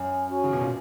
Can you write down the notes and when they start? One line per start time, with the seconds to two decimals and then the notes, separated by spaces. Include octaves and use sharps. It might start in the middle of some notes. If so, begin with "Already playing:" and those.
Already playing: F#2 C#5 G#5
0.27 C#4 F#4 C#5 G#5
0.44 C#3
0.53 B2
0.61 A#2